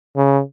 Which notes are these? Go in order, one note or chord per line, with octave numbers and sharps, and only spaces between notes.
C#3